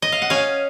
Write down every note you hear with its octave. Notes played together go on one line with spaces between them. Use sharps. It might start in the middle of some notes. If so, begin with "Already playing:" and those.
D#5
F5
F#5
C#4 F5 G#5